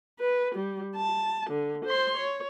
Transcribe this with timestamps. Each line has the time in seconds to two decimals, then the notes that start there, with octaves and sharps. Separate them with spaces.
0.20 B4
0.55 G3
0.96 A5
1.50 D3
1.85 C5 C6
2.17 C#5